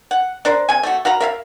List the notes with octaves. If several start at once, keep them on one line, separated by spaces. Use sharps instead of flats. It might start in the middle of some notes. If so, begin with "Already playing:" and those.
F#5
D4 A#4 C5
C3 G#5
A3 F#4
F#4 F5 A#5 B5
A#4 E5 F5